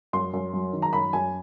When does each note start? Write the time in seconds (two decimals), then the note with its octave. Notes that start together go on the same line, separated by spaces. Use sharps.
0.13 F#2 C6
0.33 F#2
0.53 F#3
0.73 D#3
0.82 A#5
0.93 F#2 B5
1.13 F#2 G#5